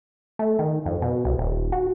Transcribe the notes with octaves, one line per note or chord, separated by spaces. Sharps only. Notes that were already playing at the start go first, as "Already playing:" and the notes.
A3
D#3
F2
B2
C2
D#1
F#4